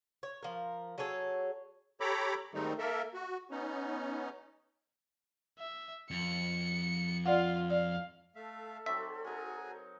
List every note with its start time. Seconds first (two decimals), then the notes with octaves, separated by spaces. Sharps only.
0.23 C#5
0.43 F3 A#4
0.98 F#3 G#4 A4 C#5
2.00 G4 A4 C#5 A#5 B5 D6
2.54 G#2 D#3 G3 A3 C4 D#4
2.79 A#3 A4 A#4 E5
3.14 F#4
3.51 B3 C#4 D#4
5.59 E5
6.11 F2 C#7
7.25 F4 D5 F5 F#5
7.70 D5 F5
8.36 A3 A4 E5 F5
8.86 F#3 C4 D#4 E5
9.24 D#4 F#4 G#4 A#4 G#5